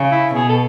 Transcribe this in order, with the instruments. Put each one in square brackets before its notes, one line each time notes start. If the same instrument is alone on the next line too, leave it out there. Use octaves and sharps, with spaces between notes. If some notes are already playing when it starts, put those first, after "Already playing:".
Already playing: [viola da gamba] C#3
[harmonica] E4
[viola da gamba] B2 [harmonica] G#4
[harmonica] A4